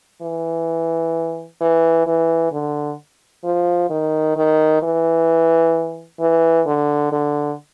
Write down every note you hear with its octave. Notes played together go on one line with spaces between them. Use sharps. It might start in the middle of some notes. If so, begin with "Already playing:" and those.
E3
E3
E3
D3
F3
D#3
D#3
E3
E3
D3
D3